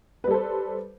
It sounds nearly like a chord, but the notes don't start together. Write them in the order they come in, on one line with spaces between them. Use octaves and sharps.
B4 G3 A4 C5